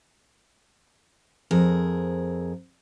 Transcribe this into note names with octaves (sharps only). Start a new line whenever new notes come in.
F2 G#4 A#4